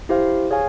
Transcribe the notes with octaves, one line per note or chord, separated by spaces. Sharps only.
E4 G4 C5 F5
G#4 C#5 F5 G#5